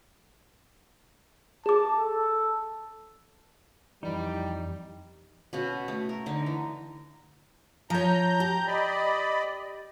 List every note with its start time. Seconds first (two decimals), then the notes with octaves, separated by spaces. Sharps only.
1.66 G#4 A5 D6
1.98 A4
4.03 F2 E3 G3 D#4
5.53 B2 C#4 F#5
5.88 A3
6.09 A#4
6.26 D3 D#4
6.46 E3
7.90 F3 C#5 A#5 G6
8.40 G4
8.67 D5 D#5 B5